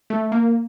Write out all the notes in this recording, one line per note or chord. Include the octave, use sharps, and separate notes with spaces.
A3
A#3